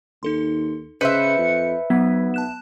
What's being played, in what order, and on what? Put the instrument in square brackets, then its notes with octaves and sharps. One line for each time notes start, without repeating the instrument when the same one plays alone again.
[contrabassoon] D#2 [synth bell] D#4 A4 C6
[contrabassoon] C#3 [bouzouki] B4 C5 E5 [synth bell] D#5 G6 [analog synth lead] C#7
[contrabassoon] F2
[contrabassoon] B1 [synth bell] F#3 G#6 B6 [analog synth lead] B3
[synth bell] A5 F#6 E7